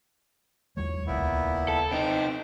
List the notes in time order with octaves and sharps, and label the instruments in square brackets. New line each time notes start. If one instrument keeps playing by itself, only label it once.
[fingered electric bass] E2 F#3 G#3 [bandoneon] C#5
[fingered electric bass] D#1 C#2 [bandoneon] A#2 B3 E4
[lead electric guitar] A4
[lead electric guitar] C3 D#4 [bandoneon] C5 G5